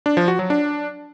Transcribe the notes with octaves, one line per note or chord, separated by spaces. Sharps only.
D4
F3
F#4
F#3
D4